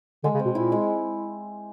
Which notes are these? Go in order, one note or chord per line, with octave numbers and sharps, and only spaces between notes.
D3 G#3
C#3
C4
B2
A#2 E4
G#3